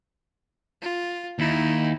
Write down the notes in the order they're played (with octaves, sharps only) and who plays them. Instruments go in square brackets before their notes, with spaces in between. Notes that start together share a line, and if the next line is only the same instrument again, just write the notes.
[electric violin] F4
[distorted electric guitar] D#2 [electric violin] D#4 E4